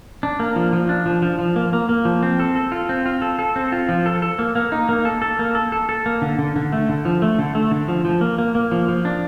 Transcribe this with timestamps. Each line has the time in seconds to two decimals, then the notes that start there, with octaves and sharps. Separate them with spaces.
0.23 D4
0.40 A#3
0.56 F3
0.73 F3
0.89 D4
1.06 F3
1.22 F3
1.39 F3
1.56 A#3
1.73 A#3
1.89 A#3
2.05 F3
2.23 C4
2.40 A4
2.55 A4
2.72 F4
2.89 C4
3.06 F4
3.22 A4
3.39 A4
3.56 C4
3.72 F4
3.89 F3
4.06 A4
4.22 A4
4.39 A#3
4.55 A#3
4.72 D#4
4.89 A#3
5.05 A4
5.22 A4
5.39 A#3
5.55 A4
5.72 A4
5.89 A4
6.06 A#3
6.22 D3
6.39 D3
6.56 D3
6.72 A3
6.89 D3
7.05 F3
7.22 A3
7.39 D3
7.55 A3
7.71 D3
7.88 F3
8.05 F3
8.21 A#3
8.38 A#3
8.55 A#3
8.72 F3
8.88 F3
9.05 D4